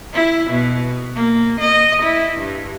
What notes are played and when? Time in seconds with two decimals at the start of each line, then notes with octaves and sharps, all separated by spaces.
0.13 E4
0.50 B2
1.15 A#3
1.60 D#5
2.02 E4
2.37 G2